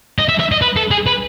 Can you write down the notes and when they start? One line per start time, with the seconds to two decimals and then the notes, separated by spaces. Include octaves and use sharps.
0.19 D#5
0.28 E5
0.40 E5
0.52 D#5
0.62 B4
0.77 A4
0.91 G#4
1.07 B4